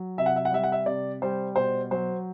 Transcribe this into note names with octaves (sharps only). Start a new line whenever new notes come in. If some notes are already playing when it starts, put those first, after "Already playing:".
Already playing: F#3
C3 E5
F#5
E5
F#5
G3 E5
F#5
E5
C3 D5
G3 C5
B2 C5
F#3 C5